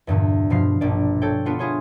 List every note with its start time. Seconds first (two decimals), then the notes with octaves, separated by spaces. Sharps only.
0.07 E2 G2 A#2 D3
0.50 G2 B2 F3 F5 C7
0.81 A#1 G2 B2 D4 D5
1.22 A4 C#5 G5
1.46 B3 D4 F4 F#5
1.59 E4 F4 G#4 C#5 C6